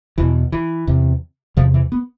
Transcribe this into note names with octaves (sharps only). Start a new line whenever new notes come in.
E2 B2 E3
E3
E2 C3
E2 C3 F3
E3
B3